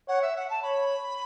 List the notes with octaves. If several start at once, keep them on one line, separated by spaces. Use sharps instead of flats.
C#5 F#5
E5
F#5
A5
C#5 B5